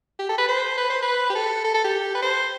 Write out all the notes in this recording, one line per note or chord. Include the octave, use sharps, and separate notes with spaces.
G4
A4
B4
C5
B4
C5
B4
G4
A4
A4
A4
G4
B4
C5